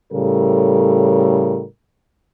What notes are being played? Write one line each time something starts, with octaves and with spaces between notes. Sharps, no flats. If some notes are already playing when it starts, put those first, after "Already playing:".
A2 C#3 G3 A4 A#4